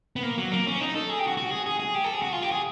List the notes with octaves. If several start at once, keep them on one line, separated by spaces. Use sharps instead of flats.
B3
A#3
F#3
A#3
C#4
D#4
A4
G#4
G4
F#4
F#4
G#4
G#4
G#4
G4
A4
G#4
F#4
F4
G4
G#4